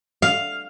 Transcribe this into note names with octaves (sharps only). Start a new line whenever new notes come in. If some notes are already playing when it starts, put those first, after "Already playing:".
F5